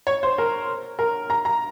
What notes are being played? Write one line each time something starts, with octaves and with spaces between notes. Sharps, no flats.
C#5
C5
A#4
A#4
A#5
A#5